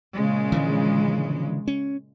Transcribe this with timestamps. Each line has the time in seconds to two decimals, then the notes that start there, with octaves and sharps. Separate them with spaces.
0.16 A#2 C#3 G#3
0.52 D3 E3 F3
1.68 C#4